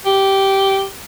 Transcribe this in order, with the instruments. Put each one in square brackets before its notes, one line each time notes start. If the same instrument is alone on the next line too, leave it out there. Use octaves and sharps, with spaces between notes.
[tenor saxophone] G4